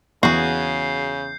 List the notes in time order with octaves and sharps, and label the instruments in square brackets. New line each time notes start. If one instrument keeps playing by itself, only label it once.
[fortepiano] E2 F#5 [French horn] C#3 [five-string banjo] F#4 G#4 [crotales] G6 C7